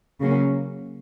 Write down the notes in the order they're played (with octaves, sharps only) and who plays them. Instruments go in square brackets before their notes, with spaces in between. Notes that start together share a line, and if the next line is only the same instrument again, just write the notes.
[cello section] C#3 F#3 A#3 C#4